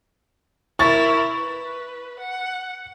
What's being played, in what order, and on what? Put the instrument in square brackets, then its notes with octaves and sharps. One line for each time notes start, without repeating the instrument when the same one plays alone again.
[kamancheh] E4 A#4 [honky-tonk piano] C#6 A6
[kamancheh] B4
F#5